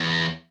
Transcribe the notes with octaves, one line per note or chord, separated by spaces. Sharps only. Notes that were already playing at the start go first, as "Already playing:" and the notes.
Already playing: E2